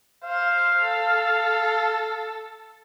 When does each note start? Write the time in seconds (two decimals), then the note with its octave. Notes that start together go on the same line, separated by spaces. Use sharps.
0.25 C5 F5
0.81 A4